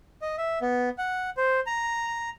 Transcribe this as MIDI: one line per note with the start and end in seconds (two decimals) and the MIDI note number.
0.22 0.36 75
0.38 0.59 76
0.61 0.89 59
0.98 1.30 78
1.37 1.60 72
1.66 2.30 82